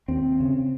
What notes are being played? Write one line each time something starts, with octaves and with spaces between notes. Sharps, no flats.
D#2 C4
C#3